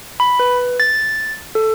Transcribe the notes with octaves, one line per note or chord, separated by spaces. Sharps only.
B5
B4
A6
A4